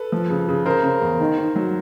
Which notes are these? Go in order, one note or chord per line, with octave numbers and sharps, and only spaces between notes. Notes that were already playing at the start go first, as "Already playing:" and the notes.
Already playing: A4 B4
F3
C#3
C#3
C#3 A#4 C5
C#3
E2
D#3
D#3
F#3